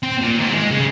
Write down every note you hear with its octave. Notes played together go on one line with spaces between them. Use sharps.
C4
A#2
D#3 C4
G#3
C#3